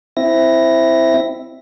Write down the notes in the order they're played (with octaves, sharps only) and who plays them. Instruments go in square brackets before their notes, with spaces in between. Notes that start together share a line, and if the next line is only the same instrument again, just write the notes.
[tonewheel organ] C4 E4 E5 A#6